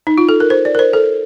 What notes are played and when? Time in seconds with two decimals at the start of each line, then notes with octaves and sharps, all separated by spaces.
0.07 D#4
0.18 F4
0.29 A4
0.40 A#4
0.50 C5
0.65 D5
0.75 A#4
0.79 C5
0.93 A4